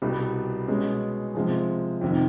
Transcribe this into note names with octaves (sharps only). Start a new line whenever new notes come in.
C2 B2 G3 B3
B2 G#3 C#4
C3 F3 G#3
F2 C3 D#3